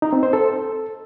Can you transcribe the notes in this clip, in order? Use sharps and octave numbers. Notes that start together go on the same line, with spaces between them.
D#4
C4
C5
A4